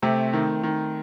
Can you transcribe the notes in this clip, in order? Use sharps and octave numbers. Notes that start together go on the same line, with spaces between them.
C3 A3 C4
D#3
D#3